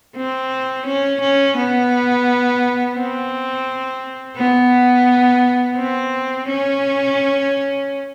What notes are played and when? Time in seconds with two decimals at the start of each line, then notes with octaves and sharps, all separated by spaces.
0.16 C4
0.86 C#4
1.21 C#4
1.57 B3
2.97 C4
4.37 B3
5.77 C4
6.48 C#4